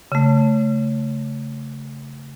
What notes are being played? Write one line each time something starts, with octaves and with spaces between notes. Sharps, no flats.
C#3 A3